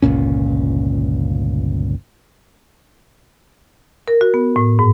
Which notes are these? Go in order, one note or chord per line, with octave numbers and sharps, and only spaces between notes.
G1 C#2 A#2 C#4
A#4
F#4
B3
A2
G#2